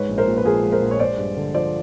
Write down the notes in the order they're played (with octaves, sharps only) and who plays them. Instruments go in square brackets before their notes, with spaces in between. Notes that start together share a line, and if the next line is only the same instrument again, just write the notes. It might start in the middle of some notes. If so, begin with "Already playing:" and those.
Already playing: [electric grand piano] G#2 G#3 [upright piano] B4 C#5
[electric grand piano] A#1
[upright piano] A#4 C5
[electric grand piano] A#2
[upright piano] B4
[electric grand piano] F3 [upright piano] G#4 A#4
[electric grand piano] G#3
[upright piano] A#4 C5
[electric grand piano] A#1
[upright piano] C#5
[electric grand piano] G#3 [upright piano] C5 D5
[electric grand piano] G2
D3
[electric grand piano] F3 [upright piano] C5 D5